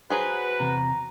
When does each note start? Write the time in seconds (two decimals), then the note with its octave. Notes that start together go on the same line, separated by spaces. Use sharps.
0.10 F#3 F#4 G#4 B4 C5
0.60 E2 C3 A#5